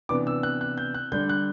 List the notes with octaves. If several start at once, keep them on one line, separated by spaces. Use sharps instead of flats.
C3 E3 B3 D4 D6
E6
F#6
F#6
G6
F#6
D3 G3 D4 G6
F#6